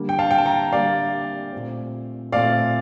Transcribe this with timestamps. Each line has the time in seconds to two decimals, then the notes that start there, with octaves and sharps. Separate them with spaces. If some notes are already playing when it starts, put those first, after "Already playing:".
Already playing: D3 G3 A#3
0.09 G5
0.19 F5 A5
0.31 G5
0.38 A5
0.46 G5 A#5
0.72 D3 G3 A#3 D5 F5
1.52 A#2 A3 C4
2.32 A#2 A3 C4 D5 F5